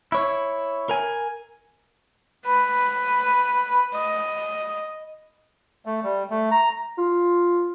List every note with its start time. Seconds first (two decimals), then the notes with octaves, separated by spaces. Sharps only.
0.12 E4 C#5
0.89 A#4 G#5
2.47 B4
3.94 D#5
5.86 A3
6.03 G3
6.30 A3
6.51 A#5
6.98 F4